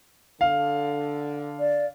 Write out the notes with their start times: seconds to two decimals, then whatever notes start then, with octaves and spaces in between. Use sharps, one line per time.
0.41 D3 F5
1.60 D5